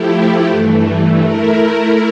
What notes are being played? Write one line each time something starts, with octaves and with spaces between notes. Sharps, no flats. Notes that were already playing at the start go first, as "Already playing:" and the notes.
Already playing: F3 A3 E4 G4
G2 E3 A3
A3 E4 A#4